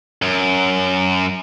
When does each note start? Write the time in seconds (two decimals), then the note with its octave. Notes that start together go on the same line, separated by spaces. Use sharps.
0.22 F#2